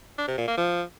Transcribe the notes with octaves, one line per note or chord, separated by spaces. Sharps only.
D4
C3
A#2
A#3
F3